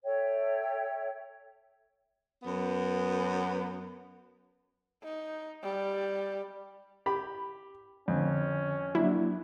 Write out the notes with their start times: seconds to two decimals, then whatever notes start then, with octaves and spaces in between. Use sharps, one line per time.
0.04 A4 C#5 E5 G5
2.43 F#2 B3
5.03 D#4
5.63 G3
7.06 G4 B5
8.08 F2 D3 C#4
8.95 F#3 A#3 D4 E4